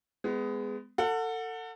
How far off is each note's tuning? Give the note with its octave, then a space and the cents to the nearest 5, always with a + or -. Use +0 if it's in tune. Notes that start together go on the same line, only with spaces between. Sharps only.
G#3 +0 B3 +25
A4 +30 F#5 -15